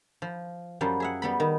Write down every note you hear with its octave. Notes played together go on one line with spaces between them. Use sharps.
F3
F#2 F3 G3
G#4 E5 F#5
G3 B3 B5
D#3